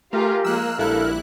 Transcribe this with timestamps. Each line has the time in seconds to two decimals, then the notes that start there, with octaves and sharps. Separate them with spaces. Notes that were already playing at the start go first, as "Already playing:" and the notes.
0.13 A3 F4 G4 G#4 A#4 F5
0.45 F3 G#3 A#3 E6 F#6
0.78 A#1 G3 E4 A4 F#6